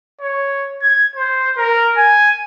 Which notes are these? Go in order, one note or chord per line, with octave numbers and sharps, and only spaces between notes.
C#5
G#6
C5
A#4
G#5